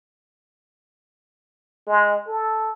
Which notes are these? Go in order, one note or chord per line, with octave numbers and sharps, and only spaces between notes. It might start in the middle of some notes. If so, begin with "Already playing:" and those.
G#3
A4